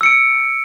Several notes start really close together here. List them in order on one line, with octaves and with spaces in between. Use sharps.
E6 C#7 D7